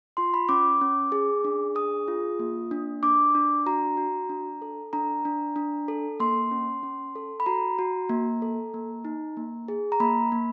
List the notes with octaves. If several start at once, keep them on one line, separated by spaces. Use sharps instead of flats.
F4 C6
B5
C#4 D6
C#4
G#4
D4
G#4 D#6
F4
A#3
D4
D4 D6
D4
F#4 A#5
F#4
D4
A4
D4 A#5
D4
D4
A4
A#3 C6
C#4
C#4
A4
B5
F#4 A#5
F#4
A#3
A4
A#3
D#4
A#3
G#4
A#5
A#3 B5
A#3